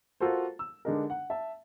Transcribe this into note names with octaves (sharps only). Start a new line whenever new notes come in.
F4 F#4 A4 A#4 C5
E6
D3 G#3 D4 D#4 A#4
F#5
E5 A5